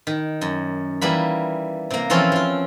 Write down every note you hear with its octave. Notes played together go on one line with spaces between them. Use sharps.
D#3
F#2
E3 G3 A#3 B5
C3 A#3
E3 F3 C4 C#4 F4 A4
F3 F4